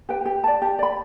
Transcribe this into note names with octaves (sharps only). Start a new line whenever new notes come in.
G4 B4 G5
G4
D5 A5
G4
D5 B5